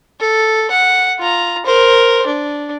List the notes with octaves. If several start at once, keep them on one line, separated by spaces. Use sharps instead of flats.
A4
F#5
F4 A#5
A#4 C5
D4